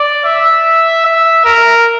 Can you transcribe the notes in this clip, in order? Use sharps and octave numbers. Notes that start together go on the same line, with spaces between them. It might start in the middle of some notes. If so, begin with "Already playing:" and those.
Already playing: D5
E5
E5
A#4